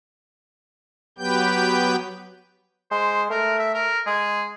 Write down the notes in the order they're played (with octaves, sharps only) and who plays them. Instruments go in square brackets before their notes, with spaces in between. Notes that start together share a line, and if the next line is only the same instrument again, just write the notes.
[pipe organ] F#3 B3 G4 B4 G5 G6
[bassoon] G#3 [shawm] C5
[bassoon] A3 [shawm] A#4
[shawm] E5
A#4
[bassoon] G#3 [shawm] G#4